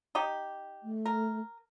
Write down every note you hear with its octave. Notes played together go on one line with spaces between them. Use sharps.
D#4 G4
A3
A#4